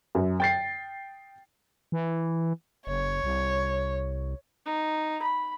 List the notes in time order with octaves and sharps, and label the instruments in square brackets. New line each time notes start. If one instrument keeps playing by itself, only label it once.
[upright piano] F#2
G5 A6 C7
[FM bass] E3
[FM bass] F#1 [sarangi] C#5
[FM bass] C2
[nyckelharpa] D#4
B5